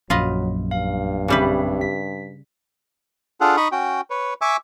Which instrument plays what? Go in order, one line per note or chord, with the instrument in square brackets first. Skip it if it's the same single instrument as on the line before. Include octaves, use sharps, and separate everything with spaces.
[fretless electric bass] A#1 F#2 [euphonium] F#3 [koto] F4 B4 D#5
[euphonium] G2 [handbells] F5
[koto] C#3 G3 B4 [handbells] C4 G4 E5
[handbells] B6
[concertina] D4 F4 G#4 A4 F#5
D#4 B5 C#6 D#6
C#4 F#4 G5
B4 C#5
E5 G#5 C#6 D6 E6